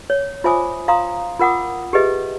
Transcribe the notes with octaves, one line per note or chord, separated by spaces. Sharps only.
C#5
F4 C5 E5 G#5 D6 D#6
F5 A#5 C6 D#6
F4 A#4 F#5 D6 D#6
G4 G#4 B4 D#5 E5